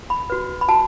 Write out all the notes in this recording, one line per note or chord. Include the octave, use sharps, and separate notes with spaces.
B5
F#4 B4
B5
F#4 A5